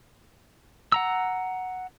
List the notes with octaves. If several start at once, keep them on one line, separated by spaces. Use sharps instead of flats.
F#5 A#5 E6